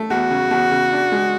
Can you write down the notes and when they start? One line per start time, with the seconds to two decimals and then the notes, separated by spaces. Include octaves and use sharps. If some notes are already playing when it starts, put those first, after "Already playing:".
Already playing: A3
0.10 E2 F#4
0.31 C#3
0.51 E2
0.71 C#3
0.91 D4
1.12 G#3